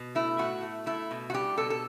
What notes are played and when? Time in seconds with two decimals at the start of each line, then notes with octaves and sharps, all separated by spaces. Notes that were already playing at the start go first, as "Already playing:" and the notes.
Already playing: B2
0.15 A3 E4
0.38 A2 F#4
0.62 A3
0.86 A3 E4
1.11 B2
1.30 F#4
1.34 G3 G4
1.58 B2 A4
1.70 A4